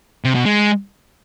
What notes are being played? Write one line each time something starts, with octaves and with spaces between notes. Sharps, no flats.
C3
B2
G#3